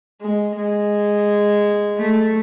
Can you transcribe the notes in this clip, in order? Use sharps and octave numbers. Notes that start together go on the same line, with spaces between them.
G#3
G#3
A3